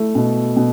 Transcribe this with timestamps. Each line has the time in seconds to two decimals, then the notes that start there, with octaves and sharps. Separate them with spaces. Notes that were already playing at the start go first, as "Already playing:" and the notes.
Already playing: A3 E4
0.15 B2
0.56 B2